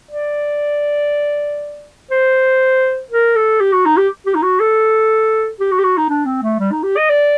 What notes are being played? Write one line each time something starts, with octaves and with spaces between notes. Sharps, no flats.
D5
C5
A#4
A4
G4
F#4
D#4
G4
G4
D#4
F#4
A4
G4
F#4
G4
F#4
D#4
D4
C4
A3
G3
D#4
G4
D#5
D5